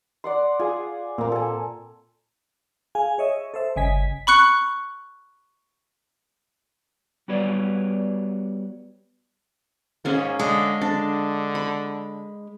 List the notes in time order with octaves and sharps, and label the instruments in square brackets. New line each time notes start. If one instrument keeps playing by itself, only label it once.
[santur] D5 F#5 C6
[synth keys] F4 G#4 [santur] G#5
[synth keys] A#2 [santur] A#3 C4
[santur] A4 G#5
[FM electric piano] G#4 F5 G#5
G#4 C#5 D#5 E5
A4 C5 E5
G1 C#3 D#5 G#5 B6
[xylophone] B5 C#6 F#6 C#7
[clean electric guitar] G3 B3 F#4 B4 C#5 D5
[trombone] G#2 [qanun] A#3 C#4 G#4
[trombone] D3 [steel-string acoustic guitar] G#3
[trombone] D3 [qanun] D4
[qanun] B5